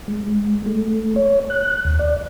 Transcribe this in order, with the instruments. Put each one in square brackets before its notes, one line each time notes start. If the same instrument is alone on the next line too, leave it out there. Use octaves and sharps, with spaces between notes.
[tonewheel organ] G#3
A3
C#5
F#6
D#2
D5